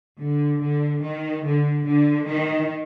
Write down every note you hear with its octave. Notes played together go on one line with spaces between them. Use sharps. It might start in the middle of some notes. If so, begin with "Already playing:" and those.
D3
D3
D#3
D3
D3
D#3